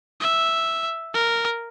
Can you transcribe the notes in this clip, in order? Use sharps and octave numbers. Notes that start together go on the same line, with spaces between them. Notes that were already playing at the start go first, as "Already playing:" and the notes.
E5
A#4